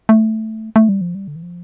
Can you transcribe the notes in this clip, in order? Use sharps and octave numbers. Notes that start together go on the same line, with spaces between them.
A3
A3
G3
F3
G3
D3
E3
F3